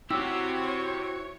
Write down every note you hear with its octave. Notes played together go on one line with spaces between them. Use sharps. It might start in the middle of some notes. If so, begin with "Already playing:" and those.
C4 E4 F#4 G4 C#5 E6